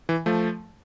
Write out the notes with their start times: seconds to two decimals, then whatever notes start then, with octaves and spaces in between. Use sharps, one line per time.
0.09 E3
0.26 F3 A3